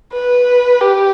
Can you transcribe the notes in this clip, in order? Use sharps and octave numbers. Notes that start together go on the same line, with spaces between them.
B4
G4